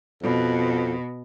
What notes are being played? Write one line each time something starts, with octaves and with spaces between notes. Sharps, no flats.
F2 B2